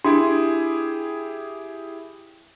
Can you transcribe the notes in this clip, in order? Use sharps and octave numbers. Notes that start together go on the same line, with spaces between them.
D4 E4 G4 G#4